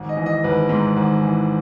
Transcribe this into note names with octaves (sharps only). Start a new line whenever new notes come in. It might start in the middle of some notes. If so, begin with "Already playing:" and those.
Already playing: G#1
D#5
E3
D#5
G#1 B4
G#2
G#1
E3